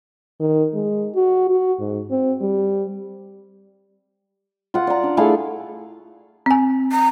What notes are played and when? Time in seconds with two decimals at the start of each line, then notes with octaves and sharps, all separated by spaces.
0.40 D#3
0.74 G#3
1.15 F#4
1.50 F#4
1.80 G#2
2.11 C4
2.41 G3
4.74 F4 F#5
4.87 D5 A#5
5.03 D4
5.17 A3 E4 G#4 F5
6.46 C4 G#5
6.92 A#5